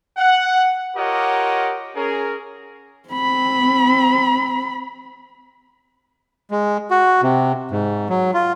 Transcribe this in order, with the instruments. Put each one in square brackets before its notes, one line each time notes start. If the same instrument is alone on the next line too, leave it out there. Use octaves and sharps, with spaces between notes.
[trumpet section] F#5
F4 G4 A#4 C#5 D#5 F#5
C#4 G#4 A#4
[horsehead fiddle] C4 B5
[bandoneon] G#3
F#4
C3
G#2
F#3
F4